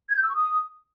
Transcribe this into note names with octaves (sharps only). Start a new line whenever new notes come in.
G#6
G6
E6
C#6
D#6